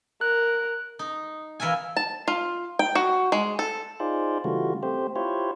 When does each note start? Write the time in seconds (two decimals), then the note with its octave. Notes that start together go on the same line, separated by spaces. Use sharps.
0.21 A#4 F#6
0.99 D#4
1.60 E3 A#4 E5 F5 G#5
1.97 A5
2.28 F4
2.79 G5
2.95 F#4
3.32 G#3
3.59 A4
4.00 D#4 F4 G#4 C5 D5
4.44 C#3 E3 G3 A3 F4 F#4
4.83 A3 C4 G4 C5
5.16 E4 F4 G4 C5 C#5